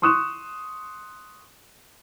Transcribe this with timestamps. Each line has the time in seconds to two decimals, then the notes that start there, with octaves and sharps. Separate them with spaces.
0.02 C6 C#6 D#6 F#6 E7